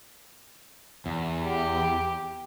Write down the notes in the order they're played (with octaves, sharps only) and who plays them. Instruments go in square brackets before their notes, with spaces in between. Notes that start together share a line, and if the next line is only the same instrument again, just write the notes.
[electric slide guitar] E2
[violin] G4